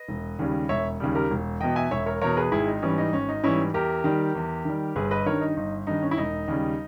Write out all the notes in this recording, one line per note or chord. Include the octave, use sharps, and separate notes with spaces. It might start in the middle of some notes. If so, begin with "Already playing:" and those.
Already playing: B4 D#5
E1
D#2 C#3 G3
E1 C#5 E5
D#2 C#3 G3
G4 A#4
E1
E2 B2 D#5 G5
E5 G#5
E1 C#5 E5
A#4 C#5
E2 B2 A#4 C#5
G#4 B4
G#1 E4 G#4
D#4
G#2 E3 G3 C#4
D#4
G#1 C#4
D#4
G#2 E3 G3 C#4 E4
E2 G4 A#4
D#3 G3
E2
D#3 G3
G1 G#4 B4
B4 D#5
G2 D#3 A#4 C#5
D#4
G1 D#4
G2 D#3 D#4
C#4
E4
E1 D#4
D#2 C#3 G3